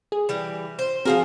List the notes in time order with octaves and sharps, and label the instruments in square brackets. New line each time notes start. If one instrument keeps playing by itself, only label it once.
[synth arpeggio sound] G#4
[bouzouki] E3 G3
C5
[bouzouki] F3 F4 A#4 [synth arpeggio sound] C4 F#4 G#4